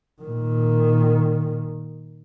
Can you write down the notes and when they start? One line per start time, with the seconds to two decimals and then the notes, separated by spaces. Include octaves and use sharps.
0.22 A#2 D#3